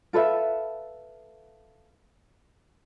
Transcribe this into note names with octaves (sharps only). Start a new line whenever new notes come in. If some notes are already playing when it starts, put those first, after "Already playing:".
F4 A4 B4 E5